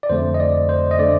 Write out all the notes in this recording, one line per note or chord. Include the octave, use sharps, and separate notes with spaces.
D5
F2 D3 A3 C5
D#5
D5
C5
D#5
D3 A3 D5